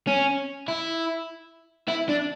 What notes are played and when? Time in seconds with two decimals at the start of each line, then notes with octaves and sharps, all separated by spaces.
0.07 C#4
0.68 E4
1.88 E4
2.09 D4